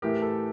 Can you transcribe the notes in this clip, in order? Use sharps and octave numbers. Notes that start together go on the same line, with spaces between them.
A2 E3 A3 G4 A#4
A4